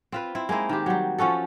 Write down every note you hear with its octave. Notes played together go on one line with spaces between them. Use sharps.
C4 F4 B4
C4 E4
G#3 A#3 D#4 E4
D#3 G#3 G4
F#3 G3
F3 C#4 F#4 A4